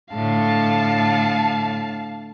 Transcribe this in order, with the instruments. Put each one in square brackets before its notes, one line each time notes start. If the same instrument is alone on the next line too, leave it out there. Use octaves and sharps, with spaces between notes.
[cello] A2 D3 [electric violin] F5 A5